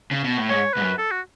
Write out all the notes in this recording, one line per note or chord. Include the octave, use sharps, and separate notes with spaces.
C#3
B2
A2
G#2 C#5
G#2 B4
F#2
A4
F#4